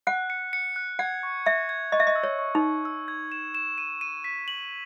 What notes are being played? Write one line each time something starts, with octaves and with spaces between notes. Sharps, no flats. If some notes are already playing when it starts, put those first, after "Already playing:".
F#5 F#6
C#7
C#7
F#6
F#5 G#6
C#6
E5 G#6
G#6
D#5 C#6
E5
D#5
E6
C#5
C#6
D#4
C#6
E6
G#6
E7
E7
D#7
D#7
B6
F#7